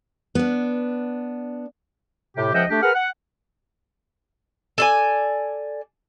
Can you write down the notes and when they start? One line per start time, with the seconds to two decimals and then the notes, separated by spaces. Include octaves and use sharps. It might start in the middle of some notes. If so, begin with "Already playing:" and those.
0.35 B3 D4
2.37 A2 C3 G4
2.54 C#2 F3 D#5 E5 F#5 G5
2.70 A3 D4 G4
2.82 G#4 A#4 B4 F#5 F6
2.94 F#5
4.78 A4 D5 G#5